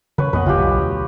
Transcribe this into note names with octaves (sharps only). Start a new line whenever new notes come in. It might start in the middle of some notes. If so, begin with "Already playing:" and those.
C#3 B4 C#5
F2 A#3 B3 B4 D#5 F#5
F#1 D2 C#3 F4 G4
B1 D3
D2